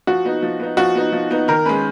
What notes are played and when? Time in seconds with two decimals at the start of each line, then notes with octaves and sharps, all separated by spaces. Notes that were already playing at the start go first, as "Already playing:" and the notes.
0.07 F3 F#4
0.25 B3 D#4
0.43 F3
0.60 B3 D#4
0.77 F3 F#4
0.95 B3 D#4
1.12 F3
1.31 B3 D#4
1.48 D#3 A#4
1.65 G#3 C#4 B4